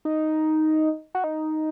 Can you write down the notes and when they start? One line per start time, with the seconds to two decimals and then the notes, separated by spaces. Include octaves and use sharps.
0.05 D#4
1.15 F#4
1.24 D#4